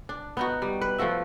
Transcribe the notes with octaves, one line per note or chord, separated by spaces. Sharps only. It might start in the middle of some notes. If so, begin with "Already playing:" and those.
D4
B3 D#4 F#4
G3
B4
F3 A3 F#4 E5